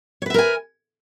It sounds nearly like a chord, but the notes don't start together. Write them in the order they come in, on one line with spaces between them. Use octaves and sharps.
C#5 B4 E5 A#4 G#5